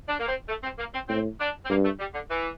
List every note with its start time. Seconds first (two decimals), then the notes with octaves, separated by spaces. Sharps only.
0.08 D4
0.20 A#3
0.28 C4
0.49 A3
0.63 C4
0.79 A#3
0.93 C4
1.09 A2 C4
1.40 D4
1.65 C4
1.70 G2 A#3
1.84 A3
1.99 G3
2.14 D3
2.30 E3